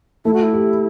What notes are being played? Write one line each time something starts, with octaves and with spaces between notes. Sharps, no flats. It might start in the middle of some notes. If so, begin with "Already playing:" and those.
A3 E4
F#4
E4
G4